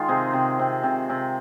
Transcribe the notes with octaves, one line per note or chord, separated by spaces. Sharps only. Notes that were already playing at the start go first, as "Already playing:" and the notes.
Already playing: D#3 G#3 F4
C3 D#4 G#4
C3
C3
C3
C3